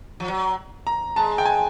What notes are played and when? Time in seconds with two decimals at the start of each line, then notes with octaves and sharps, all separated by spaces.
0.20 F3
0.28 F#3
0.87 A#5
1.16 G#3 A5
1.38 G5
1.45 G#5